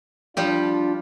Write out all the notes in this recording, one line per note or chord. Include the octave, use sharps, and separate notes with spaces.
F3 G3 D4 F4 G4